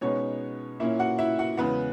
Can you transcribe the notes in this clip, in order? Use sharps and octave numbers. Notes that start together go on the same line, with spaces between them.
B2 G#3 B3 C#4 D#4 C#5
A#2 A#3 C#4 E4 E5
F#4 F#5
E4 E5
F#4 F#5
E2 C#3 G#3 B3 B4